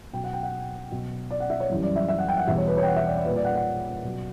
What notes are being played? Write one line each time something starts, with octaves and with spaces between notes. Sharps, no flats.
B2 F#3 G5
F#5
G5
F#5
B2 F#3
D5
F#5
E5
C#5
F#2 E3 G3
D5
E5
E5
F#5
G5
F#5
E2 B2 G3 E5
C#5
B4
C#5
G5
F#5
E5
D5
D5
A#2 G3 B4
D5
F#5
F#5
B2 F#3